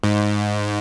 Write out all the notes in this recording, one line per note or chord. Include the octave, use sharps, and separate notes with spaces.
G#2